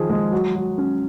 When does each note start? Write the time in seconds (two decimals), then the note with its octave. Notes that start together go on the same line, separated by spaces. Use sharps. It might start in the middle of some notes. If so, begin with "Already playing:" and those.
Already playing: D#3 F3 G#4
0.09 G#3
0.32 F#3
0.56 F#3
0.78 C#4